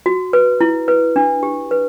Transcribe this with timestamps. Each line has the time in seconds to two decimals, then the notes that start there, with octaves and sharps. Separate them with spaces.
0.06 F#4
0.33 B4
0.61 E4
0.88 B4
1.16 D4
1.43 G4
1.71 B4